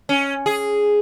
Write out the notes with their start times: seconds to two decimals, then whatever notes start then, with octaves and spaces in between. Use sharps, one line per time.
0.09 C#4
0.46 G#4